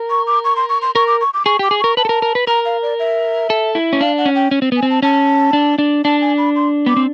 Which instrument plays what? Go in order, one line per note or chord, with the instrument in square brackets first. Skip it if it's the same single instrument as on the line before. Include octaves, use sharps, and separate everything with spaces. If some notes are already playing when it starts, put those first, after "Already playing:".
Already playing: [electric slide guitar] A#4
[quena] C#6
D6
C#6
C6
C#6
C6
[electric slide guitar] A#4 [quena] C#6
[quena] D6
C#6
D6
[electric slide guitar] G#4 [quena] C#6
[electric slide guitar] G4 [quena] D6
[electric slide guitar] G#4
[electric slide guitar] A#4 [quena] C#6
[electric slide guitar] B4 [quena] A5
[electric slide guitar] A4
A#4
A#4
B4
[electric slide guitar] A#4 [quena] A#5
[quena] F5
D5
E5
[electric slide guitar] A4
E4
C#4
[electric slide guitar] D4 [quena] F5
[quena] F#5
[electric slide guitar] C#4
[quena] G5
[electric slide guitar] C#4
C4
[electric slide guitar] B3 [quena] G#5
[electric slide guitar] C4
[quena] A5
[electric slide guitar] C#4 [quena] A5
[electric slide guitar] D4
D4
[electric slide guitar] D4 [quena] A5
[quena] G#5
B5
C6
[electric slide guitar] B3 [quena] D6
[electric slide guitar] C4